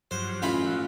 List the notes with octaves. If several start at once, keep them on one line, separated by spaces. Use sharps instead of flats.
G2 F3 F#3 C5
A1 F4 B5
F3 E4 F#4